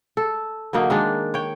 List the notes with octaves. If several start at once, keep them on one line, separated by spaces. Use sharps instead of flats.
A4
D3 F#3 A#3 D#4
D#3 G#3 D4
C#5 G5